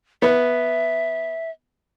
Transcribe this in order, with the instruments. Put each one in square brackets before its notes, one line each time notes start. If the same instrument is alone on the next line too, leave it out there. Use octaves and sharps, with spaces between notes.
[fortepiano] B3 [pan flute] E5